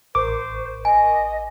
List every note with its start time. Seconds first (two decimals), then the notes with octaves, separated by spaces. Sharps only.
0.15 A1 A#4 C5 C#6 D6
0.85 D#5 G#5